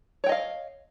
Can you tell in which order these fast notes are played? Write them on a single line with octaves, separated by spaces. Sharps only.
C#5 G5 D#5 F5